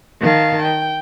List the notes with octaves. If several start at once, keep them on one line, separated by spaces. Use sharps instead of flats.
D#3 F5 A5
G5